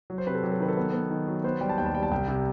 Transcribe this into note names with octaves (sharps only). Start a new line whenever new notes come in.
F#3
C5
C3 B4
A4
F#3 G4
A4
D#3 B4
A4
B3
B3
D#3
F#3
B3 C5
G3 G5
A5
D#2 G5
A5
G3 G5
A5
C2 G5
C3